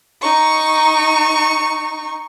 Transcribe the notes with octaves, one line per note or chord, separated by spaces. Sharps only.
D#4 C#6